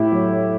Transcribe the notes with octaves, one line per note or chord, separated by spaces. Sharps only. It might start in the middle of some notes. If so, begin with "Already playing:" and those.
Already playing: A2 E4 G4
F#3